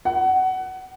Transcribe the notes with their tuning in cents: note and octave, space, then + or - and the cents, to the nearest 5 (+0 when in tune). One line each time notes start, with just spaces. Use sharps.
F#5 +20